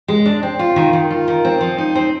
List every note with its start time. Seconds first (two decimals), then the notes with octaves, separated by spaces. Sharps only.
0.08 G#3
0.26 D4
0.43 C4
0.59 F4
0.76 D#3
0.93 D#3
1.10 F4
1.28 D#3
1.45 C4
1.61 F3
1.78 D#4
1.95 C4